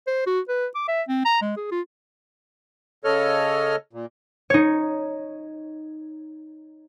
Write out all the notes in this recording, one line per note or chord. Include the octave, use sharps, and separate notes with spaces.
C5
F#4
B4
D6
E5
C4
A#5
G#3
G#4
F4
C#3 A4 C#5 D#5 F6
A#2
D#4 C#5